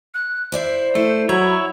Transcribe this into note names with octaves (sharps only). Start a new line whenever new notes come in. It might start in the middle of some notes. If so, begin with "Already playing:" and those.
F#6
E4 C5 D5 E5
A3 E4
F#3 E4 C#5 A#5 B5